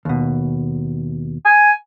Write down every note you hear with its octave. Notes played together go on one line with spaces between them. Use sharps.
D#2 B2
G#5